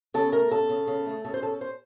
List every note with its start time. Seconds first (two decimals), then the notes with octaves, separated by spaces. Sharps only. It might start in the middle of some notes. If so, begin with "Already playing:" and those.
0.14 C#3 A4
0.32 A3 A#4
0.51 C#3 A4
0.69 C#3
0.87 C#3
1.06 A3
1.25 C#3 A4
1.34 C5
1.42 C#4 A4
1.61 C5